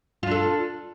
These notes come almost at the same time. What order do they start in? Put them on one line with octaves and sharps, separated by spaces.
F4 D4 A4